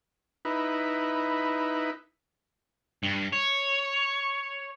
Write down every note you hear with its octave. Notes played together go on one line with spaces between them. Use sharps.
D#4 E4 B4
G2
C#5